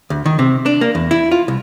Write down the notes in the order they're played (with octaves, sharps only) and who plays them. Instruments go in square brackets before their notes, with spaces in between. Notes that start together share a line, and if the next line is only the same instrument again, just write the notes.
[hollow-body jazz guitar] D2
D#3
C3
D4
A#3
E2
E4
F4
C2